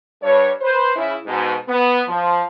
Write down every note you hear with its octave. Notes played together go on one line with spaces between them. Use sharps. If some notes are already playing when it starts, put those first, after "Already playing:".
G2 C#5
B4 C5
C#3 E4
G#2 B2
B3
F3